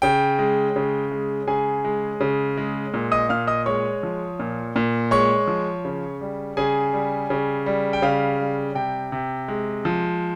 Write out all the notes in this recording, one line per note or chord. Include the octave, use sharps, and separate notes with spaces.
C#3 G5
G#3
C#3
G#3
C#3 G#4 G#5
G#3
C#3
G#3
A#2
D#5 D#6
A#2 F5 F6
D#5 D#6
G#3 C#5 C#6
F3
A#2
A#2
G#3 C#5 C#6
F3
C#3
G3
C#3 G#4 G#5
G3
C#3
G3
G5
C#3 F5
G3
C3 G5
C3
G#3
F3